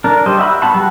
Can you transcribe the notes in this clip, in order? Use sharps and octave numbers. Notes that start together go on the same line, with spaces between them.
D4 A#4
G3 C5 D#5
F#4 E5 G5 B5
B3 F#5 A5 B5 C#6
G3 F#4